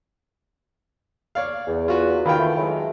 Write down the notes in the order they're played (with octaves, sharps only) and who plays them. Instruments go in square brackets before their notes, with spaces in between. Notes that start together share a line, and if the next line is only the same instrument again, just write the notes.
[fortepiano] C#5 D5 F5
[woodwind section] E2
[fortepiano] F4 F#4 B4
[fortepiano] D#3 F4 G5 [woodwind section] F5 B5
[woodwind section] E3 A3
F#3 G#3 A3